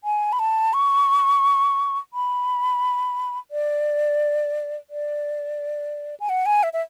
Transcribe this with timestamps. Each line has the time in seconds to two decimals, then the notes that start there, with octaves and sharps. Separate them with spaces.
0.04 G#5
0.33 B5
0.39 A5
0.73 C#6
2.13 B5
3.51 D5
4.90 D5
6.20 G#5
6.29 F#5
6.46 G#5
6.63 E5
6.73 E5